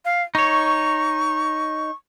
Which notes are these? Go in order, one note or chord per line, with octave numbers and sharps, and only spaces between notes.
F5
D#4 C#5 C#6